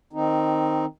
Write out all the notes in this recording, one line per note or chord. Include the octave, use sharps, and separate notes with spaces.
D#3 C4 D#4